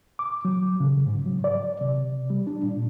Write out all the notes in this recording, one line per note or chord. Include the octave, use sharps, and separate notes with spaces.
D6
F#3
C#3
G#2
F#3
D5
C3
G3
D4
A#2